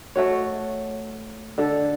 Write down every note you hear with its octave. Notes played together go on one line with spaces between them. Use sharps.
A3 F#4 C#5
D3 A4